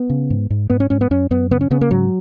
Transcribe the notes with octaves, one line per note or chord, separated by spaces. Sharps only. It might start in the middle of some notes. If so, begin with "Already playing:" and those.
Already playing: B3
C#3
G#2
G#2
G#2 B3
C#4
G#2 C#4
B3
F#2 C#4
F#2 B3
C#3 B3
C#4
C#3 B3
A#3
G#2 F#3